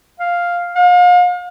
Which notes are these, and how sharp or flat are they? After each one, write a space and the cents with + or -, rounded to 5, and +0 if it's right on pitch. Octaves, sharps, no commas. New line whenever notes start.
F5 +0
F5 +40